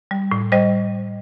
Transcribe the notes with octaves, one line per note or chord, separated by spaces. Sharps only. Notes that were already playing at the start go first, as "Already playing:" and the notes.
G3
A2
G3 C5 D#5